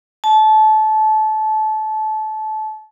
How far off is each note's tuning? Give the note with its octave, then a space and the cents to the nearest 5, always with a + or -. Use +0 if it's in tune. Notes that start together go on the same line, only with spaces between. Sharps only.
A5 -25